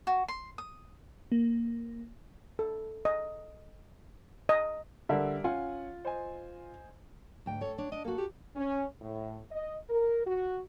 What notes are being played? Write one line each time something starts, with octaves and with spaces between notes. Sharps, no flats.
F#4
C6
D#6
A#3
A4
D#5
D#5
D3 G3 A#4 E5
C#4 F4 F#5 G#5
C5 D#5 G#5
D2 G#2 G5
A4 C#5
D4 C#5
D4 D#5
A#3 F#4 A4
G4
C#4
A2
D#5
A#4
F#4